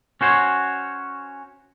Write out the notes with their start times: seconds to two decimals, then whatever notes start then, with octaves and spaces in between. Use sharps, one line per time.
0.21 C#4 F#4 C5 C#5